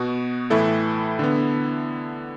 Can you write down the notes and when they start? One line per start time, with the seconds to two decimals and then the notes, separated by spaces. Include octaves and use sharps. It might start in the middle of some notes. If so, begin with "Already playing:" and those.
Already playing: B2 B3 F#4
0.50 A2 E3 A3 E4 A4
1.19 D3 B3